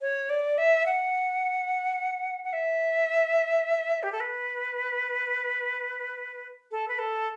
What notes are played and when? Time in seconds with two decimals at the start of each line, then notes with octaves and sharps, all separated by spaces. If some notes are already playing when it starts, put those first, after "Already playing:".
0.01 C#5
0.30 D5
0.58 E5
0.86 F#5
2.44 F#5
2.53 E5
4.03 G4
4.12 A4
4.20 B4
6.71 A4
6.88 B4
6.99 A4